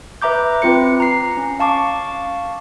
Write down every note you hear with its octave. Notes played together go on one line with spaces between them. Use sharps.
B4 E5 A#5 D6 G6
C4 F4 B4 C#7
A#5 C7
C#4
F5 A5 C#6 D6